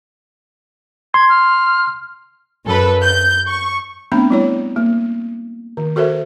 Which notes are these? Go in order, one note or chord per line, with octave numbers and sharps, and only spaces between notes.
C6 G#6
F6
F#2 A4 B4
G6
C#6
A3 B3 C4 D4 B5
G3 E4 C#5
A#3
D#3
F#4 A4 A#4 C5 E5